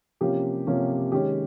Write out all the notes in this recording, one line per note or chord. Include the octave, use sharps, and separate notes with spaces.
C3 F3 A#3 C#4 G4
C3 F3 A#3 C#4
D#3 G#3 C#4 G4